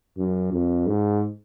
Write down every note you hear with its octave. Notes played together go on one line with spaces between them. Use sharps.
F#2
F2
G#2